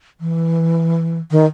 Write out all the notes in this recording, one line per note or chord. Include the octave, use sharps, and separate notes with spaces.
E3
D#3